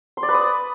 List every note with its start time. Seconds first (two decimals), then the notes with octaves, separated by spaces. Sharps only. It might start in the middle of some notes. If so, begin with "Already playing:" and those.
0.17 C6
0.23 D5
0.29 B4
0.34 D#6